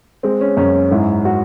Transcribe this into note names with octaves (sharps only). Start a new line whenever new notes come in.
G#3 C4
C#4
F#2 C#4
C#4
G#2 E4
F#4